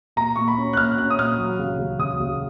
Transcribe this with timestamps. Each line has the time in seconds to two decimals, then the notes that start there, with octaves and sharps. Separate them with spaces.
0.16 A#2 A#5
0.36 A#2 C#6
0.48 B5
0.58 C#4
0.73 F#6
0.77 A#2 F6
0.98 C#4 F#6
1.10 D#6
1.18 A#2 F6
1.39 F#3
1.59 C#3
1.79 C#3
1.99 C#3 D#6
2.20 C#3